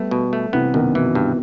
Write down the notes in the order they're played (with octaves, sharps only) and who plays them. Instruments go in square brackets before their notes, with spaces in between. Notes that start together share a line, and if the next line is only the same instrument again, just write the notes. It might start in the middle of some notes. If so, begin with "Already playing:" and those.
Already playing: [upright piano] G3 B3 [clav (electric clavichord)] A3
[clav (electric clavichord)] B2
A3
[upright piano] C3 E3 [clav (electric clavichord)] B3
[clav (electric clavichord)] F#2 [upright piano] B2 D#3
[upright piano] B2 [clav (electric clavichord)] E3
[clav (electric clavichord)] G2